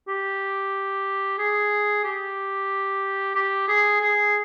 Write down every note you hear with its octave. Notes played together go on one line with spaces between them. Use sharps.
G4
G#4
G4
G4
G#4
G#4